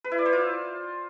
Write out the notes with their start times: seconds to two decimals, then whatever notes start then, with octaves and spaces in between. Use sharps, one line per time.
0.04 B4
0.12 E4
0.19 D5
0.26 C5
0.33 F4